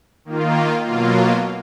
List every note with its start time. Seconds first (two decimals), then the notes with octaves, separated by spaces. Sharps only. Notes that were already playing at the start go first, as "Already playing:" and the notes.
0.25 D#3 A#3 F4
0.84 B2 F#3 A#3 F4